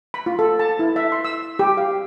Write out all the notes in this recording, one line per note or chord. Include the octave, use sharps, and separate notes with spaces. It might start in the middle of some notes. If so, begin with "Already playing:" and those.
B5
F4
A4
A5
E4
E5
C6
E6
G4
F5